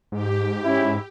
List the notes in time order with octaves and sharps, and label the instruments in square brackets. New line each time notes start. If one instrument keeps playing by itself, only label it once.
[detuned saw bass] G#2 [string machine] G4
[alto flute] C#4 [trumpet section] E4